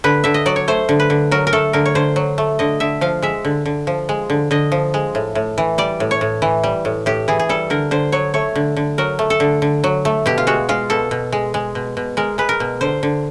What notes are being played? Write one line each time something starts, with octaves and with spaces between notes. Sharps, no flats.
D3 B4
D3 E5
D#5
F#3 D5
C#5
A3 C5
D3
B4
D3
F#3 A#4
A#4
A3 A4
D3 A#4
C#5
D3 C5
F#3
A3
D3 D#5
D3 E5
F3 F5
G#3 E5
D3
D3
F3
G#3
D3
D3 D#5
F3
G#3
A2
A2
E3
G3 D5
A2
C#5
A2
E3
G3
A2
A2 G4
E3 G#4
G#4
G3 A4
D3 A#4
D3 C5
F#3 C#5
A3 C#5
D3
D3
F#3 A#4
A3
A4
D3
D3
F#3
A3
B2 G4
F4
G#3 F#4
G#3 F4
B2 A4
B2
G#3
G#3
B2
B2
G#3 A#4
G#3 B4
A#4
B2
D3 C5
D3